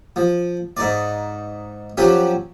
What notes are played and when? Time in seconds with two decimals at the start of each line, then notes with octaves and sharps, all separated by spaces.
0.16 F3
0.77 G#2 D#4 D5
1.97 F3 F#3 C#4 G4